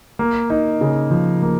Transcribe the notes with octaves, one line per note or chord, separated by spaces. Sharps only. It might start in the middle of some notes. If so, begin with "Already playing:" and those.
A#3
D#4
C#3
F3
A#3